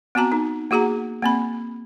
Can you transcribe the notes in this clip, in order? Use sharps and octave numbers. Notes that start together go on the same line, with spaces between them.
B3 C4 F#4 A5 A#5
D#4
A#3 F#4 G#4 F#5 A#5
A#3 C4 B5